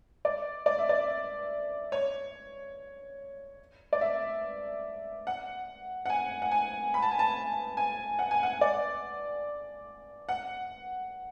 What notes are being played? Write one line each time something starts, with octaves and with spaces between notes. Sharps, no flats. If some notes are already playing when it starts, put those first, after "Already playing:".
D5
D5
E5
D5
C#5
D5
E5
F#5
F#5
G#5
F#5
G#5
B5
A5
G#5
A5
G#5
F#5
G#5
F#5
D5
F#5